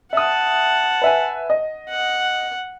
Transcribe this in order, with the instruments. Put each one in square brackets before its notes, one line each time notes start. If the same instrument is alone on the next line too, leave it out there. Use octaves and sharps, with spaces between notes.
[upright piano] E5 D#6 [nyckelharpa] F#5 A5
[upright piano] B4 E5 G#5
D#5
[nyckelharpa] F#5